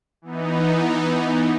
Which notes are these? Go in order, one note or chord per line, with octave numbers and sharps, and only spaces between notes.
E3 B3 D#4